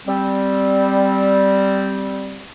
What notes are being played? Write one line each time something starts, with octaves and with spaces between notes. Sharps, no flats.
G3 C4